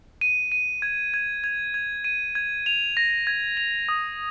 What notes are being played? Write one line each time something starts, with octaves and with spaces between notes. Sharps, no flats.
D#7
D#7
G#6
G#6
G#6
G#6
D#7
G#6
F7
A#6
G#6
F7
D#6